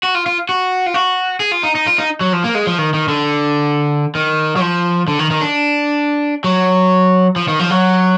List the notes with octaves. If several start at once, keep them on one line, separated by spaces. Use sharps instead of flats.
F#4
F4
F4
F#4
F4
F#4
G#4
F4
D#4
D#4
F4
D#4
F#3
F3
A#3
G#3
F3
D#3
D#3
D3
D#3
F#3
F3
D3
D#3
D#3
D4
F#3
F3
D#3
F3
F#3